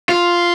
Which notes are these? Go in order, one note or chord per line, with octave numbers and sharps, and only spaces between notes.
F4